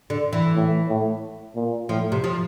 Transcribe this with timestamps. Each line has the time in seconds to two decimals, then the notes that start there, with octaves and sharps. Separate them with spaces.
0.10 D3
0.33 E3
0.55 A2
0.88 A2
1.56 A#2
1.89 A2 F3
2.12 C3
2.24 F3